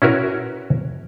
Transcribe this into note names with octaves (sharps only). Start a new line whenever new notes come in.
C#4 E4 F#4 A#4 B4